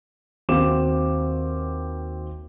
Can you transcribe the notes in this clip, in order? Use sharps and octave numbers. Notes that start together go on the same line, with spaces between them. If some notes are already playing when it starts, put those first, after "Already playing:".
D#2 C4 F#4 F5 D6 E7